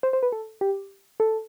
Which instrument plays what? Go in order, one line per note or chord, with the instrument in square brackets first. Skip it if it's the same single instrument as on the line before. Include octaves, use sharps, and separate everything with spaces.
[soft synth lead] C5
C5
B4
A4
G4
A4